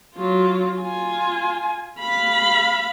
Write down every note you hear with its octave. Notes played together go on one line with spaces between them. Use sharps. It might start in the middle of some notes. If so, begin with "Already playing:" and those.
F#3 F4
F4 G#5
F5 B5